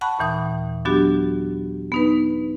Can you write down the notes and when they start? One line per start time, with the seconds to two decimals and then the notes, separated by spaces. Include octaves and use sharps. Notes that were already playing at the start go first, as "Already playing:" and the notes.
0.01 F#5 A5 B5 C#6 F#6
0.19 D#2 A#2 E3 D#6
0.85 F#3 B3 D4 F#4 G4
1.92 B3 D#4 B4